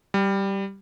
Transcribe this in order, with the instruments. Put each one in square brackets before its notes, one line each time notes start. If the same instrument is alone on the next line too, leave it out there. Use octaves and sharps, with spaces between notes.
[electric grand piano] G3